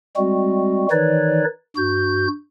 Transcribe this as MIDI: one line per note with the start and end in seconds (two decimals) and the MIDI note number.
0.17 0.87 55
0.17 0.87 56
0.17 0.87 60
0.17 0.87 66
0.91 1.44 51
0.91 1.44 52
0.91 1.44 63
0.91 1.44 71
0.91 1.44 73
0.91 1.44 74
1.77 2.28 43
1.77 2.28 66
1.77 2.28 91